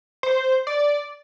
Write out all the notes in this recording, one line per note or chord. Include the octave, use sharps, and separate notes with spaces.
C5
D5